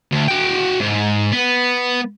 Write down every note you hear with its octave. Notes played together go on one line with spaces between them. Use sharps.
D2
F#4 G5
G#2
B3